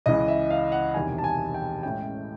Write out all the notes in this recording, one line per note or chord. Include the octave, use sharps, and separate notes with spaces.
C#2 C#3 E3 D#5
E5
F5
F#5
E1 E2 C3 D#3 G3 G#5
A5
G#5
G5
A1 A2 E3 G#3 C#4 G5